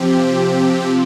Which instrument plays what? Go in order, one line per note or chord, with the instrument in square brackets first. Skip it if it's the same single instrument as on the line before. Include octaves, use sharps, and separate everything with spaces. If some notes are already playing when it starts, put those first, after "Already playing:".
Already playing: [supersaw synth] C3 F3 C4 G4